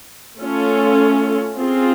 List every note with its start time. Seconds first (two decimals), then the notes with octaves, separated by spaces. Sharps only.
0.39 A3 C#4 F4 A4
1.59 C4 F4 G#4